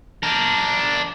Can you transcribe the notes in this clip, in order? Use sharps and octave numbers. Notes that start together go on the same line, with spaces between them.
D4 A#4